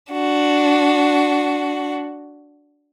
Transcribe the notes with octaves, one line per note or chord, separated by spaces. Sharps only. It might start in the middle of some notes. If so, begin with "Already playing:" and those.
D4 F#4